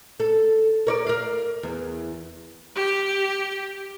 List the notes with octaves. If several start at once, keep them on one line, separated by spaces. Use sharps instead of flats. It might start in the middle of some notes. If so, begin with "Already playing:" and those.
A4
A#4 C#5 D5
A#4 F5
E2
G4